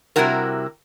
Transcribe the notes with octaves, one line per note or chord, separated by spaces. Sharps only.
C3 D#3 G3 E4 F#4 A#4